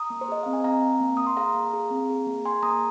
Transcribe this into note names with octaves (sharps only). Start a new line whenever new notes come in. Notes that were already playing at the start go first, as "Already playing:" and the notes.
Already playing: A#5 D#6
A#3
C5
G#4 D#5
C4 F5
G#5
C4 F5 A#5
C4
A#3
A#3 D#6
C6
G#4 F5 A#5
A#3
G#4
C4
G#4
A#3
G#4 G#5 C6
A#3 A#5 D#6